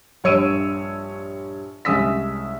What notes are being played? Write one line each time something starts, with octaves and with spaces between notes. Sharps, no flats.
A#1 G2 C#5 E6 D7 D#7
C2 G#3 C#4 D#6 E6 B6